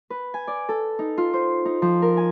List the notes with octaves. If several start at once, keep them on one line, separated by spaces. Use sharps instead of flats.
B4
G#5
D5
A4
D#4
F4
C5
D#4
F3
A#4
G#5